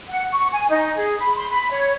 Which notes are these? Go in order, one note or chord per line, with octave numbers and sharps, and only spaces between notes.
F#5
C#6
G#5
D#4
G#4
B5
C6
B5
C#5